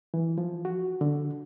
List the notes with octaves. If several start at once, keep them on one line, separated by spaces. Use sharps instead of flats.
E3
F3
F#4
D3